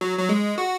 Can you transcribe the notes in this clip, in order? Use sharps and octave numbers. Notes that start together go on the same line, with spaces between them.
F#3
F#3
G#3
F#4